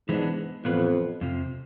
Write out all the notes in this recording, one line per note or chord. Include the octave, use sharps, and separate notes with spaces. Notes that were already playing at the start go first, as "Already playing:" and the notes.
G#2 E3 G#3 B3 D4
F2 A2 E3 B3 F4 B4
F2 C3 F3